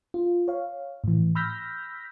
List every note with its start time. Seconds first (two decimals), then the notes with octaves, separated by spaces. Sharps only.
0.14 F4
0.48 C#5 F5
1.04 A2 E3
1.35 B5 E6 F6 G6 A#6 B6